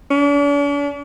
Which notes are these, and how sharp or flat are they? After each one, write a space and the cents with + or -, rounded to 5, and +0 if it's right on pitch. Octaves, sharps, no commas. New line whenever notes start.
D4 -45